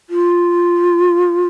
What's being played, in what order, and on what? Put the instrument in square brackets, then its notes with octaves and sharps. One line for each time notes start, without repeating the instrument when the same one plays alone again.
[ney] F4